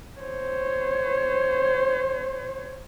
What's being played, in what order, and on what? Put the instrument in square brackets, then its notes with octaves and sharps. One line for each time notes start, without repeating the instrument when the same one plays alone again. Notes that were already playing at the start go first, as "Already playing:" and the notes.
[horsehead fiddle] C5 C#5